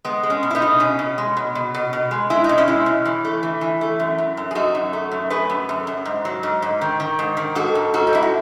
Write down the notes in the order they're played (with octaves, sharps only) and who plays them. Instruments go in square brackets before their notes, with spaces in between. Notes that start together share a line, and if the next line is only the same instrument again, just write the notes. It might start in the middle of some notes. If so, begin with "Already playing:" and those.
[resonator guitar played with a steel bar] G#3 B3
G#3
C#4
B2
E4
B3 D#4
B2
B2 C#4
B2
G#3
B2
B2
B2
B2
G#3
G#3 E4
D#4
B2
C#4 E4
G#3
B2
E3
A3
E3
E3
A3
F#2
F#2
F#2
G#4
F#2 D#4 F#4
F#2
A3
F#2
A3 G#4 B4
F#2
F#2
F#2
G#2
F#3
G#2
G#2
D#3
D#3
G#2
D#3
G#2 F#4 A4
G#2
G#2 F#4 A4
D#4
G#2 E4
F#4